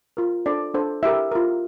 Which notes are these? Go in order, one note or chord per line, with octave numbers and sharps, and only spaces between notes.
F4 A#4
D4 A4 C5 D5
D4 A4 C5
E4 G4 A#4 E5
F4 A#4